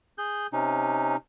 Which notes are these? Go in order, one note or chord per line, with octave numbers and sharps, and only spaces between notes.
G#4 G6
C3 C#4 D#4